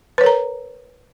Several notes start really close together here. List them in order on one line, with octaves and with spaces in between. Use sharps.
B4 C#5 A#4 A#5